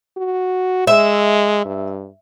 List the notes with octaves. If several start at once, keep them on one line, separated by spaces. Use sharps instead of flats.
F#4
G#3 E5
G2